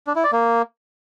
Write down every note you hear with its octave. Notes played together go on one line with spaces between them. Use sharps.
D4
E4
D5
A#3